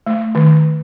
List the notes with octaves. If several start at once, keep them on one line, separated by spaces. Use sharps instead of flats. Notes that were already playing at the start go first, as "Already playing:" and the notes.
A3
D#3